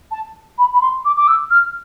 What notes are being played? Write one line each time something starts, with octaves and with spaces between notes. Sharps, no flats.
A5
B5
B5
C6
D6
D6
E6
F6